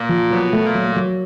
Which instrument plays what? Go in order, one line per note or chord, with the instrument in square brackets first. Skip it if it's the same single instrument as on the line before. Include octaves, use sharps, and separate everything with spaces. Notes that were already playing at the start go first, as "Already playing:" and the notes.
Already playing: [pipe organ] A#2 A#3
[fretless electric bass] F3
[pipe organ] B2 B3 [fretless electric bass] F#3
[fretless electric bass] A3
[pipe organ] A#2 A#3
[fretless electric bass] F#3
F#3